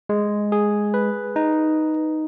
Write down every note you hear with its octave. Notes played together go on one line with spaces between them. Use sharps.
G#3
G#4
B4
D#4